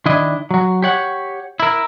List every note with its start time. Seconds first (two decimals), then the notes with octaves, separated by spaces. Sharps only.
0.06 D#3 D4 E4 D#5
0.51 F#3 F#4
0.82 G4 C#5 F#5
1.60 E4 A#4